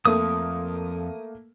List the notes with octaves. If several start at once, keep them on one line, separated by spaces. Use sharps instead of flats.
F2 A3 A#3 D#6